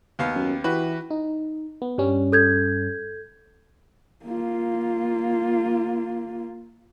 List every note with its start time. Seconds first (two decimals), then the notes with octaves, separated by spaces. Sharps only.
0.19 D#2 B3 F5
0.35 F#2
0.64 E3 F#4 G4 B4
1.11 D#4
1.82 B3
1.98 G2 G3 C#4
2.32 A4 G6 G#6
4.26 A#3 F4